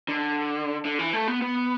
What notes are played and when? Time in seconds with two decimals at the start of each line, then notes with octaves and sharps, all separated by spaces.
0.08 D3
0.85 D3
0.99 E3
1.13 A3
1.28 B3
1.42 B3